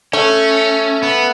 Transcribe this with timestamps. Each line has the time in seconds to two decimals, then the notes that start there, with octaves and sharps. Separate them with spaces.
0.13 A3 C#4
1.03 B3